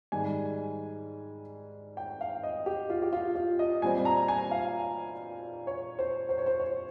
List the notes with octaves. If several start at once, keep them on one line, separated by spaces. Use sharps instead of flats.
G#2 D#3 G3 G#5
G5
F5
D#5
G4
F4
G4
F4
F4
D#5
A#2 G3 C4 G#5
A#5
G#5
F5
C#5
C5
C5
C#5
C5
C#5